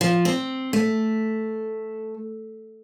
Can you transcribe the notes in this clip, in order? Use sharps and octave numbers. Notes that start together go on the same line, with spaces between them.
F3
C4
A3